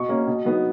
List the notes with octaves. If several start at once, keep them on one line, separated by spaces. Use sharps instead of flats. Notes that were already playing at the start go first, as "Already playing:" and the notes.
Already playing: B2 C#6
A#3 C#4
B2
F#3 B3 D#4